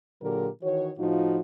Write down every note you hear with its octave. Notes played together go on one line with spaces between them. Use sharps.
A#2 D3 F#3 G4 G#4 A#4
D#3 E3 F#4 C#5
A2 F3 D#4 F4 F#4